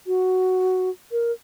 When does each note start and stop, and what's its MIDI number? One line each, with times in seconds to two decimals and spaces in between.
0.07 0.90 66
1.12 1.32 70